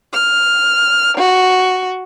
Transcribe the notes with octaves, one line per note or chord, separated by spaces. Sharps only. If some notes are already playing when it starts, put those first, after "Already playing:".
F6
F#4